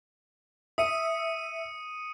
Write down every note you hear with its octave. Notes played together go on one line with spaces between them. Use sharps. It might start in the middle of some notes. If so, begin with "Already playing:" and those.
E5 D#6 C#7 D#7